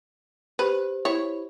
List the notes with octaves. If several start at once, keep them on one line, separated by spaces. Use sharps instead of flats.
G4 B4 C5
E4 C#5